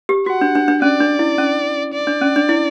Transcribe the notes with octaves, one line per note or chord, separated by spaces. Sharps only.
G4
F#4 F#5
D4
D4
D4
C#4 D5
D4
E4
C#4
D5
D4
C#4
D4
E4